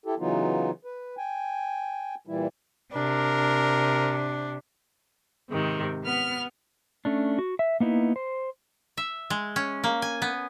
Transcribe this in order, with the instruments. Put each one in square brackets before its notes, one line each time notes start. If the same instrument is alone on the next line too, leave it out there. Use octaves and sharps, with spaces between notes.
[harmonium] E4 G4 A4
C#3 E3 F#3 B3 D#4 F4
B4
G5 G#5
A#2 E3 G3 E4
[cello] C3 [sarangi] D4 [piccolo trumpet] A#4
[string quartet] G#2 C3 D#3
B3 F6
[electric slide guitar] A3 C#4 D4
F#4
E5
A#3 B3 D#4 E4
C5
[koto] E5
G#3
C#4
A#3
G#5
B3